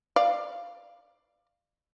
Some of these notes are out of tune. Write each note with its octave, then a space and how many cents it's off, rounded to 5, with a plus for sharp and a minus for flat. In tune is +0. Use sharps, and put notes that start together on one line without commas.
D5 +35 F5 +0